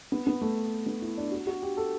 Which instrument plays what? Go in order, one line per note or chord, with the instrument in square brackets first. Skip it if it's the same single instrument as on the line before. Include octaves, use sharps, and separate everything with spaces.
[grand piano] B3
B3
A3
B3
E4
D4
F#4
F#4
G4
A4